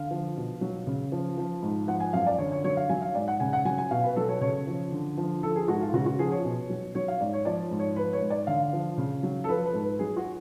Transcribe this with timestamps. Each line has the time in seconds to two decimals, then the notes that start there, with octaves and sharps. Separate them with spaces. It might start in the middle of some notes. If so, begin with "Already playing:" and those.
Already playing: D3 F5
0.11 F3
0.37 B2
0.61 F#3
0.87 C#3
1.12 F3
1.38 F3
1.62 G#2
1.87 F3 F#5
2.00 G#5
2.13 F#2 F5
2.27 D5
2.38 D3 C#5
2.52 C#5
2.64 F#3 C#5
2.77 F5
2.89 F#3 G#5
3.02 F5
3.15 G#2 D5
3.28 F#5
3.40 C#3 G#5
3.53 F#5
3.65 F#3 G#5
3.78 G#5
3.91 B2 F5
4.03 B4
4.16 F#3 A4
4.29 C#5
4.41 C#3 C#5
4.67 F3
4.92 D3
5.17 F3
5.43 F3 A4
5.56 G#4
5.68 G#2 F#4
5.81 F4
5.93 C#3 F#4
6.06 F#4
6.19 F3 G#4
6.32 C#5
6.44 B2
6.70 F#3
6.95 F#3 C#5
7.08 F5
7.20 G#2 D5
7.33 C#5
7.45 F3 D5
7.71 G#2
7.79 C#5
7.96 F3 B4
8.13 C#5
8.21 G#2
8.30 D5
8.47 D3 F5
8.73 F3
8.98 C#3
9.23 F#3
9.44 A4
9.48 F3 B4
9.65 B4
9.74 G#2
9.82 B4
9.99 F#3 G#4
10.17 F#4